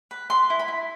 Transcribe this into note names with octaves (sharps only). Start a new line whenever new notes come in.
B4
B4 C6
E4
B5
E4